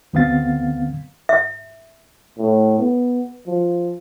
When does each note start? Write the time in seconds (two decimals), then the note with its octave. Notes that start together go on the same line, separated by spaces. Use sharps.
0.13 D2 D3 B3 C4 F5 A6
1.29 E5
2.38 A2
2.78 B3
3.47 F3